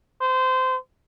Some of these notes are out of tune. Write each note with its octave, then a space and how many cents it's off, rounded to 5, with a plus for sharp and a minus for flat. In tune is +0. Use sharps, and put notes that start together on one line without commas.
C5 -25